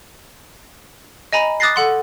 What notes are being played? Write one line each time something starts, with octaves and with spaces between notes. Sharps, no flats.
D#5 G#5 A#5 B5
D6 D#6 F#6 A6 A#6 C7
A4 F#5 C6